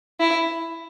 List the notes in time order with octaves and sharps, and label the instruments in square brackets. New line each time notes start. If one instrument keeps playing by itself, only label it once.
[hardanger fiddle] E4